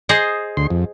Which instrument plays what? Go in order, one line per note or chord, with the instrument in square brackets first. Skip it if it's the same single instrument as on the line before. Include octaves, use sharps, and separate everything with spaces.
[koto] G#4 C5 D#5
[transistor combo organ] D2 C6
F2